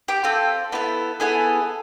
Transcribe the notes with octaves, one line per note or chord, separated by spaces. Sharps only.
G4 G5
C4 F4 A4
B3 E4 A4
B3 E4 G#4 A4 G#5